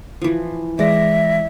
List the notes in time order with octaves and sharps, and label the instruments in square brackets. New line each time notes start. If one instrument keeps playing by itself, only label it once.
[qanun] E3 F3
[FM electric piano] E3 G#3 A#6 [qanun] D5 [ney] E5